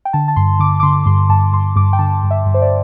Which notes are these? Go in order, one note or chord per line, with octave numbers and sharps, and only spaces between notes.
G5
D3 A5
A5
G2 C6
D3 D6
D6
D3 C6
G2 C6
G2 A5
G2 C6
G2 D6
G5
D3 A5
G2
E5
G2
C5
D5